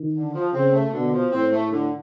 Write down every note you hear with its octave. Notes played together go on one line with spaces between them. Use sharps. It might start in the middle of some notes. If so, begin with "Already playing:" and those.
Already playing: D#3
D3
F3
C#3 C4
A3
B2 D3
F3
A2 C4
A3
D3